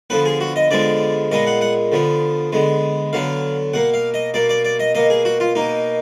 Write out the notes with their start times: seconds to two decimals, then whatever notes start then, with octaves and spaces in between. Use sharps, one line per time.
0.10 D3 F3 B3 B4
0.26 G#4
0.41 F#4
0.56 D#5
0.71 D3 F3 G#3 B3 D5
1.31 A#2 G#3 B3 D#5
1.47 F#5
1.61 F#5
1.92 D3 F3 B3
2.52 D3 G#3 B3
3.13 D3 F#3 B3 F5
3.74 B2 A#3 F#5
3.94 F5
4.14 D#5
4.34 B2 A#3 D5
4.49 D5
4.65 D5
4.80 D#5
4.95 B2 A#3 D#5
5.10 G#4
5.25 F#4
5.40 F4
5.55 B2 A#3 D#4